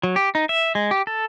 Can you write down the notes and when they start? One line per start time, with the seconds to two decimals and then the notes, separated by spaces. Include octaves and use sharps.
0.03 F#3
0.16 G4
0.35 D#4
0.49 E5
0.75 G#3
0.91 G4
1.07 A4